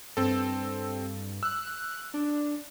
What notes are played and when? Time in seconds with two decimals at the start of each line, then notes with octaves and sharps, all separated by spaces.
0.17 G2 C4 A4
1.43 E6 F#6
2.14 D4